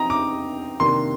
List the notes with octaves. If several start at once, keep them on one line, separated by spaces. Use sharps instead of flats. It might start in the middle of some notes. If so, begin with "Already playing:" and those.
Already playing: F3 C4 D#4 D#5 G5 A#5
D6
C3 D#3 A#3 D4 C6